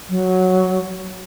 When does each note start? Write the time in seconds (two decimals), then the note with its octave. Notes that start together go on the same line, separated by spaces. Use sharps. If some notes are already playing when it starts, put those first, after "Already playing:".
0.09 F#3